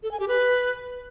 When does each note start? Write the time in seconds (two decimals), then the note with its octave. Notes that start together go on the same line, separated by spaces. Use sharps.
0.03 A4
0.11 G#5
0.20 G4
0.28 B4